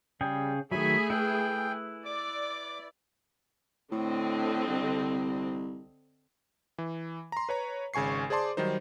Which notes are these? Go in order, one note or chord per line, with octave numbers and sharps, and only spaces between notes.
C#3 G3 G#4 G5
D#3 F#3 A3 G#4 E5 G#5 B5
E4 B4 G5
D5 D6
A2 D3 C4 D#5
C2
E3
A#5 C6
B4 C#5 A#5
G#1 C#3 G#5 C#6 C7
G#4 C5 D5 A5 C6 D6
D#3 F#3 G3 D#4 C5